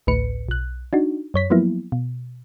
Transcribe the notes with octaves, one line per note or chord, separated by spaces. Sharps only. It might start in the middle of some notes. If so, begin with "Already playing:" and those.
A1 D2 A2 B4 C#7
B1 F#6
D4 D#4 F#4
F#2 C#5 B6
F3 F#3 A#3 B3 E4
B2